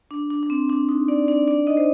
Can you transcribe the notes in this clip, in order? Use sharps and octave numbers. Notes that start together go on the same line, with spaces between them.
D4
D4
D4
C4
D4
D#4
D4 D5
D4 D5
D4 D5
D#4 D#5
C5